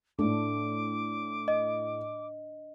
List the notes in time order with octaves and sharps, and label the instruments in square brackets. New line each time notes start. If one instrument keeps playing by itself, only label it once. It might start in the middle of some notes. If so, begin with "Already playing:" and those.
[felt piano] A2 A3 [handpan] D4 [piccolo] D6
[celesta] D#5